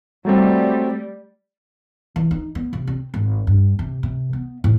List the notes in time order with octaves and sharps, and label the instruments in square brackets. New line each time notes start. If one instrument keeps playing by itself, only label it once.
[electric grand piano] F#3 A3 C4 [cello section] G3
[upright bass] E3
D#4
B3
C3
C4
G#1
G2
C3
C3
B3
A2